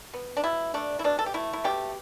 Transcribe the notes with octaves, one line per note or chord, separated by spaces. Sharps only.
B3
D4
B2 E4
A3 D4
E4
B2 D4
A4
G4
A3 E4
E4
B2 G4